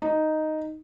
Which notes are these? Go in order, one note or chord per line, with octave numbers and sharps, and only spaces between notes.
D#4